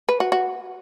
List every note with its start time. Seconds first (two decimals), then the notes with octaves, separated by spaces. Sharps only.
0.09 B4
0.20 F#4
0.32 F#4